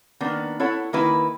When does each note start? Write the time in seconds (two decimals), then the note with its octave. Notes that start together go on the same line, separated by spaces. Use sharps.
0.21 D#3 A#3 B3 D4
0.60 E4 A4 C#5 F#5
0.93 D#3 A#3 E4 B4